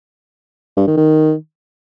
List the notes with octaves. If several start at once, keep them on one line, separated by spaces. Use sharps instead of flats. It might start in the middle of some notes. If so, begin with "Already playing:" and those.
G2
D#3
D#3